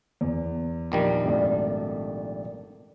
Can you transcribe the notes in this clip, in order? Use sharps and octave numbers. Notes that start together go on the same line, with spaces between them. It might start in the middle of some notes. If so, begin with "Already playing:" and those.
E2
A#1 D#3 G3
G#1 A3 D5